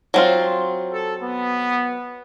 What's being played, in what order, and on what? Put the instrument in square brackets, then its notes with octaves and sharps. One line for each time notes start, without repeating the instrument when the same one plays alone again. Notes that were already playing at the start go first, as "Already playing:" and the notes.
[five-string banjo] F#3 C4 F4
[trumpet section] A4
B3